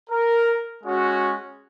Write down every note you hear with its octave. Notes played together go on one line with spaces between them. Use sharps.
A#4
G#3 C#4 F#4